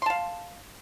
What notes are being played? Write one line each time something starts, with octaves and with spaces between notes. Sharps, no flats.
F5 A5 C6